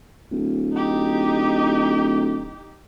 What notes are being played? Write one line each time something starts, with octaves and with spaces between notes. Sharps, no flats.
D1
D#4 G4